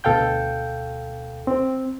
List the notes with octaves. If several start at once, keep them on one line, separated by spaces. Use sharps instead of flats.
D2 B2 A4 F5 G5 G6
C4